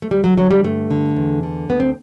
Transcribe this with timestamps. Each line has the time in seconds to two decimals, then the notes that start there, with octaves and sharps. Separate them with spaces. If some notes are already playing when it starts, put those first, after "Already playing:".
0.02 A3
0.11 D2 G3
0.24 F#3
0.37 D3 F#3
0.51 G3
0.64 G2 A3
0.91 D3
1.16 E2
1.43 D3
1.69 D2 B3
1.80 C4